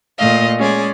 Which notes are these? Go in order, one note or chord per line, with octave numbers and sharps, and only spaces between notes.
A#2 A3 D#5 F5
G#3 C#4 G#4 D5